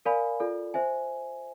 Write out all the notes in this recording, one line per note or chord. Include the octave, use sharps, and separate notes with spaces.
A#4 D5 F5 G#5 B5
F4 A4 D5
C5 E5 G#5